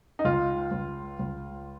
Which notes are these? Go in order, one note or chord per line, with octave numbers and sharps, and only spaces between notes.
D#4
C#2 F4
C#2
C#2